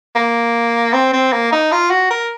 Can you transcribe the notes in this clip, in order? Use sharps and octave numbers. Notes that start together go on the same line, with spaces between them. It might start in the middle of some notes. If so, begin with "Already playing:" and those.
A#3
C4
C4
A#3
D#4
F4
F#4
A#4